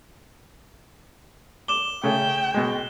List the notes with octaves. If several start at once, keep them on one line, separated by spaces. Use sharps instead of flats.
D6 E7 G7
C#3 A3 C#4 G5
B2 G#3